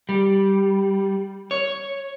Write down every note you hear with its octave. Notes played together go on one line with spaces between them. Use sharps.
G3
C#5